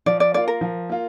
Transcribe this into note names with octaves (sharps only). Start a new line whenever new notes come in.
F3 D5
D5
A#3 F4 D5
A#4
F3
A#3 F4